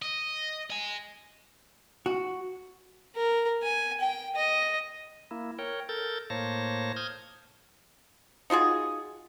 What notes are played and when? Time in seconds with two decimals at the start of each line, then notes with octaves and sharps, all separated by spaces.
0.02 D#5
0.70 D#5 G#5
2.06 F#4
3.16 A#4
3.63 G#5
4.00 G5
4.36 D#5
5.31 A#3 E4
5.59 A#4 C#5 G5
5.89 A4 A#4 G6 A6
6.30 A2 A#3 C5 C#5 A5 A#6
6.96 D#6 F6 G6 G#6
8.50 D#4 F4 F#4 G#4